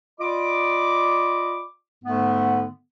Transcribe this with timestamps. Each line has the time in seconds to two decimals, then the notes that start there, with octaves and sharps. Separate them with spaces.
0.20 F4 D5 D#5 B5 D6
2.04 G#2 D3 A3 B3